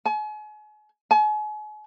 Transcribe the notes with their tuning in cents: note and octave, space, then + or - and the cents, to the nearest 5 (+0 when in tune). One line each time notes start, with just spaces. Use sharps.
G#5 +40
G#5 +40